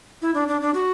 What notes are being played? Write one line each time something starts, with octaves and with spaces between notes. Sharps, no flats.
E4
D4
D4
D4
F#4